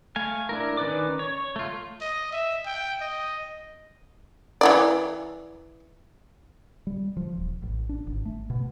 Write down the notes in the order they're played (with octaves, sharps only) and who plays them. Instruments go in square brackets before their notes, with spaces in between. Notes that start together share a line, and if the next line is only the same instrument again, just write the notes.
[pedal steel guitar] A3 F5 G#5
D4 E4 A#4
D#3 C#4 B4 D5 D6
C#5
A3 F4
[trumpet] D#5
E5
G5
D#5
[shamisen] E3 E4 D5
[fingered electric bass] G3
F3
D#1
A1
D4
G#1
A3
B2